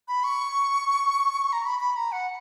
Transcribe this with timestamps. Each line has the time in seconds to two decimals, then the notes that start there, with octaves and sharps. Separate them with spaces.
0.08 B5
0.24 C#6
1.53 A#5
1.65 B5
1.80 B5
1.96 A#5
2.12 F#5